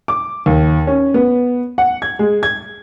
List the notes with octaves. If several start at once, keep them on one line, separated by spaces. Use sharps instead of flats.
D6
D#2
C#4
B3
F#5
G#6
G#3
G#6